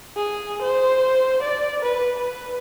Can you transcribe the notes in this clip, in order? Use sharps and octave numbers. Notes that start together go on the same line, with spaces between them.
G#4
C5
D5
B4
B4